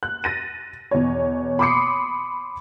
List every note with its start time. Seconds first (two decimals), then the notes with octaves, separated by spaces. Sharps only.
0.03 F#6
0.24 A6 A#6 D#7
0.91 E2 B2 C#5
1.59 B5 C6 D6 D#6 C7 C#7